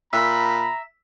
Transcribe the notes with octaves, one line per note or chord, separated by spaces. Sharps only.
A#2 E5 A#5 B5